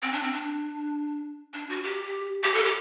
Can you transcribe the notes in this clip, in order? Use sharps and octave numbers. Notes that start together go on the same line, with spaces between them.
C4
D4
C4
D4
D4
F#4
G4
G4
A4
G4